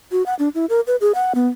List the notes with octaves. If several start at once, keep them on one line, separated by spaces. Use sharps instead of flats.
F#4
F#5
D4
E4
A#4
B4
G#4
F#5
B3